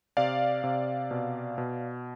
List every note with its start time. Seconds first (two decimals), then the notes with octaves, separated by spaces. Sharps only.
0.17 C3 D5 F5
0.64 C3
1.11 B2
1.58 B2